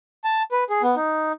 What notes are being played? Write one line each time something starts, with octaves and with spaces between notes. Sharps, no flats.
A5
B4
G#4
B3
D#4